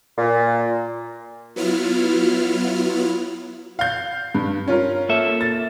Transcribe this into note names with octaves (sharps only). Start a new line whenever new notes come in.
A#2
F#3 B3 E4 F4 F6
F5 G6
G2
C#4 F4 A#4
A#3 A4 E5
A6